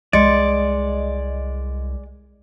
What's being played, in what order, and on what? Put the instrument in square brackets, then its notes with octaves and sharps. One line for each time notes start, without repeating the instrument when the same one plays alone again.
[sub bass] C2 [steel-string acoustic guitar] G#3 [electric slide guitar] D5 [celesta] D#5 C6 C#7